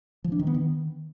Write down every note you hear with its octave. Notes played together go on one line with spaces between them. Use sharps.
F3
D4
D#3
B3
D#3